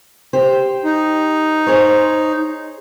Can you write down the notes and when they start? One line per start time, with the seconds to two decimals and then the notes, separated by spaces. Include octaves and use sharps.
0.33 G4 C5
0.85 D#4
1.67 G#4 C5 C#5